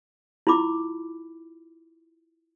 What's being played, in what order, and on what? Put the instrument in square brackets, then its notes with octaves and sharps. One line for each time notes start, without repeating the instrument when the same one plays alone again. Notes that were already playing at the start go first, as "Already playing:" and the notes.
[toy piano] E4 F4 B5 D6